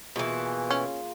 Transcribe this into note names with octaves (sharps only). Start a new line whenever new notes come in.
B2 E3 A#3 F4 G#4
C#4